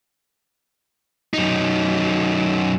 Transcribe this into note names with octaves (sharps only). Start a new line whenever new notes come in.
F#2 D#4